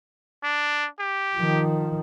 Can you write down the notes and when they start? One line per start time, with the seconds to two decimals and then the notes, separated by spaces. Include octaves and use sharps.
0.44 D4
0.99 G4
1.37 D#3 F3